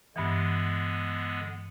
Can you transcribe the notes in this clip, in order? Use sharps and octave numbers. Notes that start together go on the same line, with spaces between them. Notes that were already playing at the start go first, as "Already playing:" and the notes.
G2 D3 E3 G#3 B3